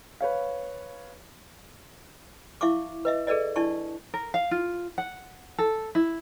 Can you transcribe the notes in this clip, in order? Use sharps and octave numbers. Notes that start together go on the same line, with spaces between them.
B4 C#5 F5
E4 E5 F5 C#6 D6
B4 D#5 E5
G#4 A4 B4 D5 D#5
D4 E4 D5 A5 C#6
A#4
F5
F4
F#5
A4
E4